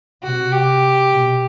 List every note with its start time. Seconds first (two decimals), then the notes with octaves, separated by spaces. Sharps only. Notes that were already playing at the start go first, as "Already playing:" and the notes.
0.24 C3 F#4
0.52 G4
1.10 B2